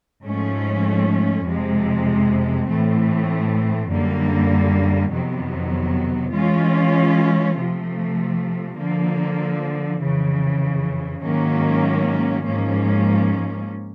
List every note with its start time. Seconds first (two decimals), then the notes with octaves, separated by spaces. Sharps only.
0.23 G#2 F3 A3 C#4
1.44 F2 C3 F3 G#3
2.67 A2 E3 A3 C4
3.88 F#2 D3 G3 A#3
5.11 F2 C3 D#3 F#3 B3
6.33 E3 G#3 C#4 F4
7.55 C3 F3 A3
8.77 D3 F3 A#3
9.99 F2 C#3 E3
11.21 G#2 D#3 F#3 A#3 C#4
12.43 G#2 F3 A#3 C#4